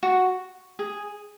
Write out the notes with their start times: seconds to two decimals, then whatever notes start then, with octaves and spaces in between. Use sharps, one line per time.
0.03 F#4
0.79 G#4